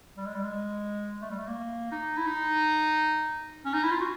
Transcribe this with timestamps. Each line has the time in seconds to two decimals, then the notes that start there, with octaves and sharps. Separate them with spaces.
0.17 G3
0.26 G#3
0.34 G3
0.43 G#3
1.22 A3
1.31 G3
1.39 A3
1.48 A#3
1.92 D#4
2.17 E4
2.26 D#4
3.65 C#4
3.74 D#4
3.83 E4
3.91 F4
4.00 F#4